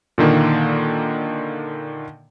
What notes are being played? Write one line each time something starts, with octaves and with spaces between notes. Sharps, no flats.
A#2 D3 D#3 A#3